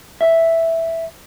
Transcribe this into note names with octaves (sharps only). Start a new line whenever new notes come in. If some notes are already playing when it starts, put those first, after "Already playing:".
E5